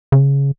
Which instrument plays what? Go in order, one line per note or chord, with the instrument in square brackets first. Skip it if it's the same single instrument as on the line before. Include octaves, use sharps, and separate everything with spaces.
[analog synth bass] C#3